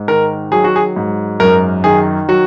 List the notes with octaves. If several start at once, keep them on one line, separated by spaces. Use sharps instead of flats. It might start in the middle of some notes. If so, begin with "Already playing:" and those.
Already playing: G#2
D#3 A#4
F#3 G#4
F#4
G#4
G#2
F#2 A#4
D#3 G#4
F#3 F#4